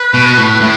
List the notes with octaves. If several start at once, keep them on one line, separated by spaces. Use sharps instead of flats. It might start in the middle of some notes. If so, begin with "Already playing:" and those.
Already playing: B4
B2
A2
A2